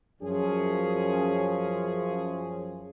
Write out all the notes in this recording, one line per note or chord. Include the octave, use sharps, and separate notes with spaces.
F#2 F3 C#4 G#4